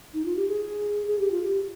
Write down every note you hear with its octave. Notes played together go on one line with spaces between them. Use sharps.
D#4
F4
G4
G#4
G#4
G4
F4
G4